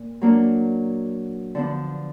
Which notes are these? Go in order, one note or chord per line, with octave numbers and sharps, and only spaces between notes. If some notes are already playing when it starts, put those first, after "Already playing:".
Already playing: A#2
F#3 A#3 D4
D3 F3 B3 D4